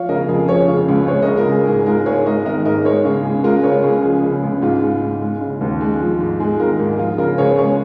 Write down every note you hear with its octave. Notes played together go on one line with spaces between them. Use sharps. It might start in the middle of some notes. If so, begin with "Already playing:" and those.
Already playing: F3 C#5 F5
C#3 A#4 D#5
F2 G#4
F3 G#4 C#5
C#3
C#2
G#3 G#4 C#5
A#4 D#5
C#3
F4 A#4
C#2 G#4
G#2 G#4
G#3 F4 A#4
G#2 G#4 C#5
G#3 A#4 D#5
D#3 A#4 D#5
G#2 A#4 D#5
G#3 G#4 C#5
C#3
C#2 G#4
G#3 F4 A#4
C#3 G#4 C#5
C#2 G#4
F3 G#4
C#3
C#2
G#2 F4
G#3
G#2
G#3
C#3
D#2
G#3
F3
G#2
G#3 G#4
D#3 F4 A#4
G#2
G#4
F3 F4
C#3 F4 A#4
C#2 G#4 C#5
G#3 G#4 C#5